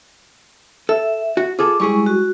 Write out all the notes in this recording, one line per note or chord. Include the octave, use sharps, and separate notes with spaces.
A4 E5
F#4
F4 G#4 A4 D6
G3 G#3 E4 G4 G#4 C#6
F#4